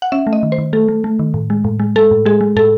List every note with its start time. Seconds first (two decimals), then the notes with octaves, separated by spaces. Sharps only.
0.02 F#5
0.12 C#4 E5
0.27 A3
0.33 D#5
0.43 D#3
0.52 C5
0.58 D#3
0.73 A3 A4
0.88 A3
1.04 A3
1.19 D#3
1.34 A2
1.50 G#3
1.64 A2
1.80 G#3
1.96 G#3 A4
2.11 A2
2.25 G#3 G#4
2.41 G#3
2.56 A2 A4